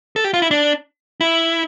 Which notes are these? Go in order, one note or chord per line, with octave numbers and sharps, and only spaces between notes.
A4
G4
F4
E4
D4
E4